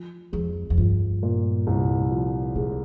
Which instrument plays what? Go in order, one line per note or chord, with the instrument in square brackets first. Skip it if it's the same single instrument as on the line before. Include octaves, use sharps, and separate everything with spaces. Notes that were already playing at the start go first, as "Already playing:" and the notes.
Already playing: [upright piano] F3
[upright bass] F2 [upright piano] G#3
[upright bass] F2
[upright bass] G2 [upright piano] F3
[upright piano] A#2
C2
F3
[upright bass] A#2 [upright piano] G#3